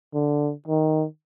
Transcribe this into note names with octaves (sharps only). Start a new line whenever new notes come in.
D3
D#3